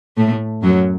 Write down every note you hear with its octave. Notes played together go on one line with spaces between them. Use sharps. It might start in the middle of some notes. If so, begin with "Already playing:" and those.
A2 A3
F#2 F#3